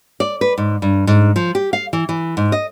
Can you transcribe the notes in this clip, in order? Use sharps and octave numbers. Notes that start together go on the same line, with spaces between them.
D5
B4
G#2
G2
G#2
F3
G4
F5
E3
E3
G#2
D#5